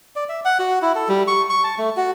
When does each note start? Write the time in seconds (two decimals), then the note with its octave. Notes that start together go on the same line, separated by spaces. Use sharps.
0.16 D5
0.29 E5
0.45 F#5
0.59 F#4
0.82 E4
0.95 A4
1.09 G3
1.28 C#6
1.50 C#6
1.64 A5
1.78 A3
1.97 F#4